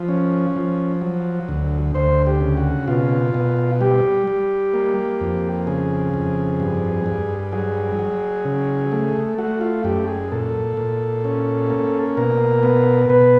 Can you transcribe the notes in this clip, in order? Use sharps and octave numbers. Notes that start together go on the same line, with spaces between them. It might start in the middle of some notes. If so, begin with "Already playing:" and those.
Already playing: F3
C#4
F3
F#3
D2
D2 C5
G4
C#3
F#4
B2 F4
B2
G3 G4
G3
A#3
F2
C#3 G#4
F2
G2
G2
F#3 G#4
F#3
C#3
A3
A3 F#4
F4
F#2 G4
G#4
A#2 A4
A#2
C#4
A#3
B2 A#4
B3
B2 B4